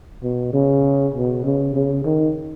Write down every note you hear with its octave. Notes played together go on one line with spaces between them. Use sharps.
B2
C#3
B2
C#3
C#3
D#3